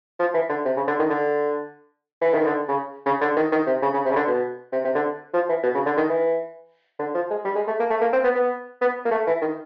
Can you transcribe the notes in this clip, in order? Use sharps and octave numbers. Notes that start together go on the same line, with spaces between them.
F3
E3
D3
C3
C#3
D3
D#3
D3
E3
D#3
D3
C#3
C#3
D3
D#3
D#3
C3
C#3
C#3
C3
C#3
D3
B2
C3
C3
D3
F3
E3
B2
C#3
D3
D#3
E3
D3
F3
G#3
G3
G#3
A3
A#3
A3
A#3
C4
B3
B3
B3
A#3
A3
E3
D#3